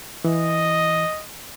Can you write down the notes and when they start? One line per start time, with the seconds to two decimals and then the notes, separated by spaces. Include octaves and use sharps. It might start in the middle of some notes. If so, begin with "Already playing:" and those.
0.24 E3 D#5